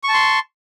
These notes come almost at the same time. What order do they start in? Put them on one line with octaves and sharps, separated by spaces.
C#6 A5 C6